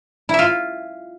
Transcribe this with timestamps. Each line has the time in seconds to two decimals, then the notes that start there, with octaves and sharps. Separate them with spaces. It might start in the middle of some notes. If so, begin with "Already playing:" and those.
0.29 E4
0.34 E5
0.39 F4